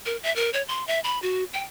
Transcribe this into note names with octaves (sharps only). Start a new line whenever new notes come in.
A#4
E5
A#4
C#5
C6
E5
B5
F#4
G5